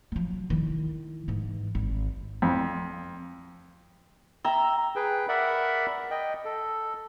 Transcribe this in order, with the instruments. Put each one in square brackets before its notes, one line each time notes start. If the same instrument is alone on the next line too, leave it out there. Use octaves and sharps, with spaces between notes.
[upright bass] F3 F#3
D#3 E4
G#2 E3
G#1 G#2
[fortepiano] F2
[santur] E5 A#5 E6 [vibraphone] G5
[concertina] G#4 B4 G5
A#4 D5 E5 F#5 B5
D#5 G5
A4